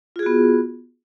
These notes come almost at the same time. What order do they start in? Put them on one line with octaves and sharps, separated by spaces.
F4 G#4 F#4 B3